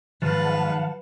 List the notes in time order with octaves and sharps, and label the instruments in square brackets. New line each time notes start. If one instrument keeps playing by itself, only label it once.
[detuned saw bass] G#2 [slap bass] D#3 F3 F#3 [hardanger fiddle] B4 [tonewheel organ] F5 F#5 A5